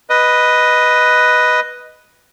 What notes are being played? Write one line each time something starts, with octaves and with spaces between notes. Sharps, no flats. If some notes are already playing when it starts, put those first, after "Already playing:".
B4 D#5